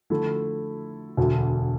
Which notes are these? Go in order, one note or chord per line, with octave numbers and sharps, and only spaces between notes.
D3 F3 A3 E4 A4
E1 D2 D3